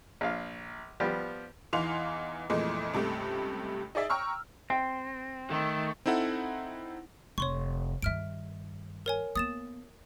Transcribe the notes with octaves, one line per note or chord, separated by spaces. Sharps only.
A#1 F5
F3 G3 B3 G4
E2 E3 D#4 F5 C6 F7
F2 A#2 E3 G#3 A3
C#2 G2 C3 A3
D#4 G#4 D5 E5
G5 A#5 C#6 E6 F6
C4 G5
D#3 A3
C4 D#4 E4 A4 F#5
F1 C#5 C6 C#6
G2 D#3 E5 F6 D7
A#4 C#5 G#5
A#3 B3 D#6 A6 E7